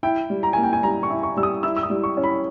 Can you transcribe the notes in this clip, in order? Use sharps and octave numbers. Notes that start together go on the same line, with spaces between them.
E4 G5
G3
A#5
A#3 G#5
G5
G#5
G3 A#5
C#6
E4
C#6
G3 E6
D#6
E4 E6
E6
D#6
G3
C#6
C#4
B5